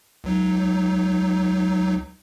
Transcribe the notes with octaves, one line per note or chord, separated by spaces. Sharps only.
C#2 F#3 D#4